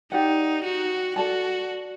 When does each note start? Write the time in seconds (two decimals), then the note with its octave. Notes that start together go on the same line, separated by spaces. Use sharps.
0.12 D#4 G4 D5 F#5
0.64 F#4
1.16 F#4 A4 D5 A5